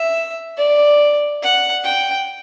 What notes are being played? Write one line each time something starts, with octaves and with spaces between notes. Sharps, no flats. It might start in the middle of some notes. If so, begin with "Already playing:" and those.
Already playing: E5
D5
F#5
G5